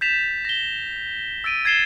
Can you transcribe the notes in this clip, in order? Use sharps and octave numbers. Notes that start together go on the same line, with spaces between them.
G6 A6 B6 E7 F7
A#6 G7
E6 A6 D7 D#7
G#6 A6 C7 E7 G7